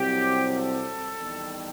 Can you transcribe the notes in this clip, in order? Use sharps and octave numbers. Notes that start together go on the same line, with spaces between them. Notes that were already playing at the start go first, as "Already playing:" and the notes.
Already playing: C2 C3 F#3 C4 G4
A4
E2 D#3 G3